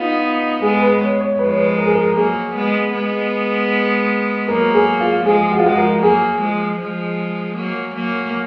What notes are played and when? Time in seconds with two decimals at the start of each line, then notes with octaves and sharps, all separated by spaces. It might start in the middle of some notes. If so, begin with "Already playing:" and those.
Already playing: B3 D#4 F4
0.62 G#3 B3 G#4
0.81 B4
1.01 C#5
1.21 C#5
1.39 F3 G#3 B4
1.49 C#5
1.58 B4
1.78 A#4
1.86 G#4
1.95 A#4
2.16 F#3 A#3 G#4
2.56 G#3 B3
2.93 G#3 B3
4.48 F#3 A#3 A#4
4.74 G#4
5.00 F4
5.25 F3 G#3 G#4
5.52 F#4
5.59 F4
5.64 F3 G#3 F#4
5.78 A#4
6.02 F#3 A#3 G#4
6.41 F3 G#3
6.80 F3 G#3
7.57 F#3 A#3
7.95 F#3 A#3